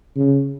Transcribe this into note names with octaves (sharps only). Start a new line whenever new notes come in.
C#3